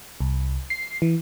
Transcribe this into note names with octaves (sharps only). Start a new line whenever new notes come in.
C2
C7
E3